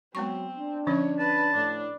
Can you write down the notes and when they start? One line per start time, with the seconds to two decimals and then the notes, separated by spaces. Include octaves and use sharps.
0.15 F#3 G#3 B3 C4 C#6
0.58 D4
0.87 D3 F3 C#4 C#5
1.19 B4 A5
1.54 A2 D4